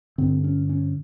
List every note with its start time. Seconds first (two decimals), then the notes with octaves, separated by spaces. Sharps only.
0.18 G2 D3 C4
0.44 C#4
0.69 C#4